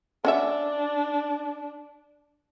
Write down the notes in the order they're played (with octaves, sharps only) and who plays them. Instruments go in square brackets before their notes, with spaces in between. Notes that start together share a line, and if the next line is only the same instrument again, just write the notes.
[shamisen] C#4 F#4 E5 [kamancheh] D4